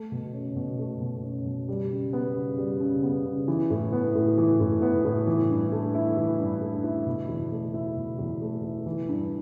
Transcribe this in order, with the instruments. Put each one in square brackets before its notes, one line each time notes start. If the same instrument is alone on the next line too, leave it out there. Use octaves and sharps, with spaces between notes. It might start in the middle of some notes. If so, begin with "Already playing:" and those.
Already playing: [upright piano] A3
B2
C#4
B2
A3
B2
C#4
B2
G3
C#3
B3
C#3
G3
C#3
B3
C#3
E3
A2
B3
A2
E3
A2
B3
A2
E3
G2
A3
E4
E3
G2
A3
E4
B2
E2
A3
E4
B2
E2
A3
E4
E3
G2